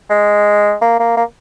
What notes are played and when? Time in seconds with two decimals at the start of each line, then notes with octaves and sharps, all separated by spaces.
0.10 G#3
0.82 A#3
0.99 A#3
1.17 A#3